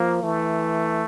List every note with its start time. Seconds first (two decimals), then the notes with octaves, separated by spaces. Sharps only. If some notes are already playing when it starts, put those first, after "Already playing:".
Already playing: F3 A#3
0.23 E3 A3